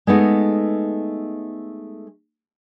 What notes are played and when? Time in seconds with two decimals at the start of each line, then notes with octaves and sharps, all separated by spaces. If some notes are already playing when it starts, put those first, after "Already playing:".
0.07 G#3 A3 B3 D#4